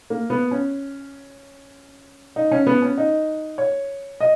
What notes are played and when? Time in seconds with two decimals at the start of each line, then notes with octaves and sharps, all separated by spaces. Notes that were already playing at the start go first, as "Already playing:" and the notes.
0.10 A#3
0.30 B3
0.51 C#4
2.36 D#4
2.51 C#4
2.67 B3
2.82 C#4
2.98 D#4
3.58 C#5
4.20 D#5